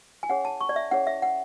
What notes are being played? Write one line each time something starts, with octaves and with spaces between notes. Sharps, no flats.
G#5
C#4 E4 G#4 C#5 F#5
A5
C#6
D5
E5
C#4 E4 G#4 C#5 F#5
E5
F#5